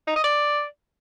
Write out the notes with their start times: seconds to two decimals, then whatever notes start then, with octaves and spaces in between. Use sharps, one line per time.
0.07 D#4
0.16 D#5
0.24 D5